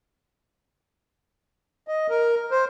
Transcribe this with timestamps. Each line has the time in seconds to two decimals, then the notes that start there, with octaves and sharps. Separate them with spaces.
1.88 D#5
2.10 A#4
2.51 C5